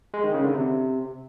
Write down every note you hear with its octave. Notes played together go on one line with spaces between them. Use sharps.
G#3
D#3
C#3
D3
C3